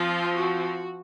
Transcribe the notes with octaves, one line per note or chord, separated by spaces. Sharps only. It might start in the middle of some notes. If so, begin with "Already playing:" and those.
Already playing: F3 C4 F4
F#4